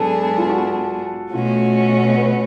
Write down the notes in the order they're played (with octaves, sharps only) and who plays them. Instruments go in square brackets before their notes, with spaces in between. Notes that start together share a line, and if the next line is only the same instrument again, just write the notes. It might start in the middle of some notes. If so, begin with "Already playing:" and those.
Already playing: [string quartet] G#2 F#3 B3 D4 G#4 [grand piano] A4
[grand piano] F4
F#4
[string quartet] B2 A3 C#4 F#4 [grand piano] F4
[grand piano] B4